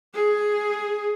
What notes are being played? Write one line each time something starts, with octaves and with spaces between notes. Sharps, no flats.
G#4